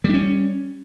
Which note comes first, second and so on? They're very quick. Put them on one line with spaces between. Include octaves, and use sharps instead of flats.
G3 D4 C#4